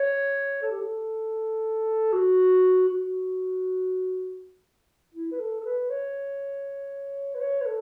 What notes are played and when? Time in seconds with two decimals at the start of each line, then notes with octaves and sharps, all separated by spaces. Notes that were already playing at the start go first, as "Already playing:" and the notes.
Already playing: C#5
0.62 A4
0.71 G4
0.79 A4
2.13 F#4
2.88 F#4
5.14 E4
5.32 B4
5.39 A4
5.60 A4
5.65 B4
5.90 C#5
7.35 B4
7.40 C#5
7.61 B4
7.66 A4